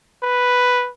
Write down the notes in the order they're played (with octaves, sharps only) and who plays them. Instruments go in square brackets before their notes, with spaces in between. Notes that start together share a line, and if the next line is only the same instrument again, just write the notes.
[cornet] B4